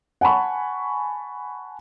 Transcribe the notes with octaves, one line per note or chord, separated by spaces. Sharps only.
F#5 G#5 A5 B5 C#6